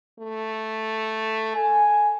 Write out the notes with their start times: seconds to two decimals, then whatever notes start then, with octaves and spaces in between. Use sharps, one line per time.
0.19 A3
1.55 A4 G#5